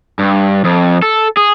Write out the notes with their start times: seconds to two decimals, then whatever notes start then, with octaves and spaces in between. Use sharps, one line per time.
0.19 G2
0.64 F2
1.02 A4
1.37 G#4